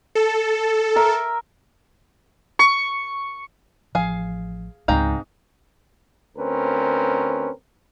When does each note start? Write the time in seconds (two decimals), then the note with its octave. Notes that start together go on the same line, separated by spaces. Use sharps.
0.15 A4
0.96 A#4 E5
2.59 C#6
3.95 A1 F3 G#4 F5
4.88 C#2 G#2 C4 F5 G5 A#5
6.37 D2 C4 C#4 A#4 B4